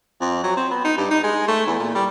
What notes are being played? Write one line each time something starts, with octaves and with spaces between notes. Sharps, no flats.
F2
F#3
C4
B3
D#4
G2
D#4
G#3
A3
E2
A#2
G3